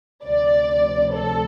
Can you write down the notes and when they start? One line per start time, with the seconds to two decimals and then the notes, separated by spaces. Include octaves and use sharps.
0.25 D2 C3 F3 D5
1.15 A4